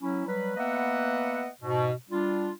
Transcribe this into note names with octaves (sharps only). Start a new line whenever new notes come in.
F#3 C#4 E4
F#3 G3 B4
A#3 B3 B4 D#5 E5 F#5
G#2 B2
G3 D4 F4